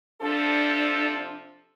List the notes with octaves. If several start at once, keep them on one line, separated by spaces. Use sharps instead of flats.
C3 F3 D4 A4